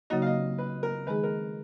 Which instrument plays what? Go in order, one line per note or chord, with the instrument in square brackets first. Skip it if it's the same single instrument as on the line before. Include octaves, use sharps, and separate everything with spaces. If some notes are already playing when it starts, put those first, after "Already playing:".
[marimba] C#3 F#3 A#3 D#4 F#4 [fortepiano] D#5
[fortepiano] F5
D#5
B4
A#4
[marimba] D#3 G#3 D#4 G#4 [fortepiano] B4
[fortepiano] A#4